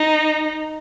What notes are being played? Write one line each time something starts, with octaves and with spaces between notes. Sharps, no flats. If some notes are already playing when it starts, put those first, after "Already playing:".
Already playing: D#4